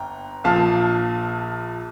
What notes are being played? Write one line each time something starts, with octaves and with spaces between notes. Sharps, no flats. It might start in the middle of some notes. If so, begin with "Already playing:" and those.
Already playing: G1 G2 G5 A#5
A#1 A#2 F3 F5 A5